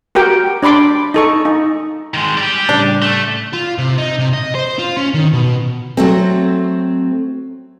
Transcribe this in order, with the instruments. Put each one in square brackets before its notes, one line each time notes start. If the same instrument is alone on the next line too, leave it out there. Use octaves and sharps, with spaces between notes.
[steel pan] F#4 G4 A#4 G5
D4 D5 B5 C6 D6
D#4 A4 C#6
D#4
[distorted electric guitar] D#3 G#3
G4 D5
[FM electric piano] A2 C#3 G3 [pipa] D4
[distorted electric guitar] A3
F4
C3
D#4
C3
D#5
C5
F4
C#4
D#3
B2
[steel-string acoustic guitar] F#3 A3 C4